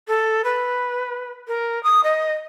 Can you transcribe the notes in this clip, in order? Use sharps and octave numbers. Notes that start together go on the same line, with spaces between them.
A4
B4
A#4
D#6
D#5